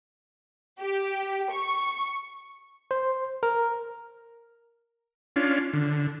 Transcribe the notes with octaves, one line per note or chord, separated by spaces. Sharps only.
G4
C#6
C5
A#4
C#4 D4 F4
D3